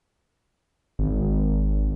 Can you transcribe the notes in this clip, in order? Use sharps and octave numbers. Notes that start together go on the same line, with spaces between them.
G#1